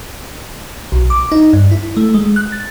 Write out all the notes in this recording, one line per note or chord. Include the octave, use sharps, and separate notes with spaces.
B1
D6
D#4
G2
E4
A3
G#3
F#6
A6